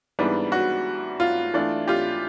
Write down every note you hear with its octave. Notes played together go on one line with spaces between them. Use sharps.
G#2 E3 G3 B3 D4
F#4
F4
E3 A3 D4 F4
F4 G4